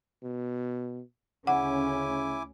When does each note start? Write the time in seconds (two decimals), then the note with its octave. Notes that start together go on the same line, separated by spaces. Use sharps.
0.23 B2
1.47 D2 C#3 C#4 E4 F#5 G#5 D6